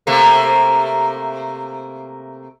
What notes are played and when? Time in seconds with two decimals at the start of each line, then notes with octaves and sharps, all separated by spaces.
0.07 C3 A3 A#3